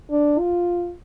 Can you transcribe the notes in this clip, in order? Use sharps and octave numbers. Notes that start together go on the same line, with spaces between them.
D4
F4